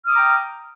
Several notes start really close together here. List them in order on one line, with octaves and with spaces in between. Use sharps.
F6 D#6 D6 A#5 G5